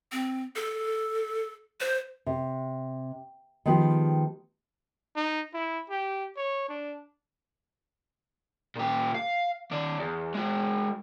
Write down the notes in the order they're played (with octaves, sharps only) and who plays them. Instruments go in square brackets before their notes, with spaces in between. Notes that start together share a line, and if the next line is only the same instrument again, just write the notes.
[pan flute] C4
A4
C5
[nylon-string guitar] C3
D#3 F3 G#3 B3 G4
[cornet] D#4
E4
G4
C#5
D4
[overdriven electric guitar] A#2 G4
F5
D#3 D5
E2
G#3 F#4